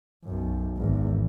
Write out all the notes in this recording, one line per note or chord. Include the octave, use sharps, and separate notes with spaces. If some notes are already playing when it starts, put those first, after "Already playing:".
B1 F#2
G#1 E2